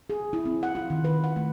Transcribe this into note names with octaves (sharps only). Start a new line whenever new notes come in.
G#4
E4
C4
F#5
F4
D#3
B4
F#5
A3